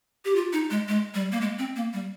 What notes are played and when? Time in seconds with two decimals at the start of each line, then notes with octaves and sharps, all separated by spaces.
0.25 G4
0.36 F4
0.53 D#4
0.71 G#3
0.88 G#3
1.14 G3
1.32 A#3
1.41 G#3
1.59 C4
1.76 A#3
1.93 G3